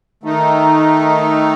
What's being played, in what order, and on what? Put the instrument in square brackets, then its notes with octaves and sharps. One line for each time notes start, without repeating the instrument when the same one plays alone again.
[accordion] D#3 A3 D#4